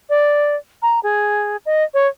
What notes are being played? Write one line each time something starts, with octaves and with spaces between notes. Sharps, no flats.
D5
A#5
G#4
D#5
C#5